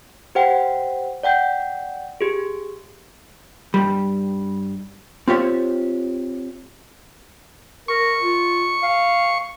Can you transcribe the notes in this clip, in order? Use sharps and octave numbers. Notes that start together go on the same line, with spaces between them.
G4 C5 F#5 G5
D5 F#5 G5 G6
G4 G#4
G2 G3
C4 F4 G4 C#5 E5
A#4 C#6
F4
F5